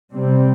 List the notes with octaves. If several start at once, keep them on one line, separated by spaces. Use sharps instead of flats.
C3 G3 C4